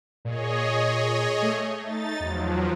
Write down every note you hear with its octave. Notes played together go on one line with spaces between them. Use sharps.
A#2 G#4 C#5 D#5
A3
D#4 A6
E2 F3 F#3